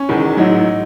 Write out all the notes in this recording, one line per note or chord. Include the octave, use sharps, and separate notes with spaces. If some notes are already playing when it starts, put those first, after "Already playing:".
Already playing: C#4
E1 E2 D#3
A1 G#2 F#3 D#4